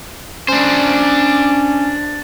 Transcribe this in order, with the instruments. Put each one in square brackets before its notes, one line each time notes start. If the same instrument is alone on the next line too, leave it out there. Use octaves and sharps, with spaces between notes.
[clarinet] C#4 [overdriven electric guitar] D4 C5